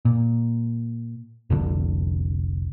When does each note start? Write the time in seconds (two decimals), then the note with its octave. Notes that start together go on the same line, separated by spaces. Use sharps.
0.05 A#2
1.50 F1 C2 D3